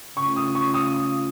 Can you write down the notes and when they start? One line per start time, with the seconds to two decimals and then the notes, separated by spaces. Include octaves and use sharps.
0.17 C#3 A3 C#4 F4 C#6
0.36 D#6
0.55 C#6
0.74 D#6